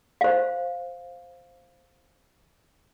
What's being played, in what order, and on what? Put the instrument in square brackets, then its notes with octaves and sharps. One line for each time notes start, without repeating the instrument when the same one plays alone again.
[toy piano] C5 F5